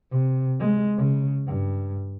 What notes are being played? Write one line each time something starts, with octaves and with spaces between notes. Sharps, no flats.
C3
G#3
C#3
G2